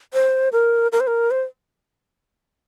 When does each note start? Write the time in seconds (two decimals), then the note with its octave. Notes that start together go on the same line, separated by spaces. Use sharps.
0.14 C5
0.52 A#4
0.92 A#4
1.00 C5
1.07 A#4
1.31 C5